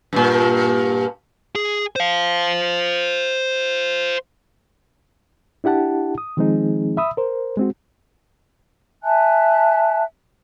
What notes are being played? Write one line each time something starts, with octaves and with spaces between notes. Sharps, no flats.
G2 A#2
G#4
C5 F5
D4 E4 G4 F#5 A5
D#6
D#3 F3 G#3 C4 D#4 G#4
E5 B5 D#6 E6
A#4 C5
G#3 C4 F#4
E5 G#5 A5 F#6